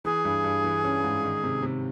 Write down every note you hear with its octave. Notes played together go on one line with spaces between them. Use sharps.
E3 G#4
G2
G2
E3
C#4
G#2
D#3
C3
C3